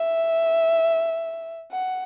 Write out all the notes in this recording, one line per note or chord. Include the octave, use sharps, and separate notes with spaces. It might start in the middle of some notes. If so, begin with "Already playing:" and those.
Already playing: E5
F#5